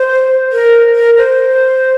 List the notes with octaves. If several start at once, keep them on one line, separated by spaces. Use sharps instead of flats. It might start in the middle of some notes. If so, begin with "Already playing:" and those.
Already playing: C5
A#4
A#4
C5